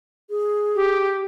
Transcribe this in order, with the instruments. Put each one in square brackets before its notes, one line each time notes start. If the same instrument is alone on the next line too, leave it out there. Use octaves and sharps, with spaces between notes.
[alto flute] G#4
[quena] G4